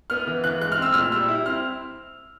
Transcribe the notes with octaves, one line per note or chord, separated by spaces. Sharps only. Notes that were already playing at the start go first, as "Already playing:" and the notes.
B3 F6
E3
E3 F#6
G#3 F#6
F6
C4 E6
A#2 F6
G3 E6
E4
C4 F6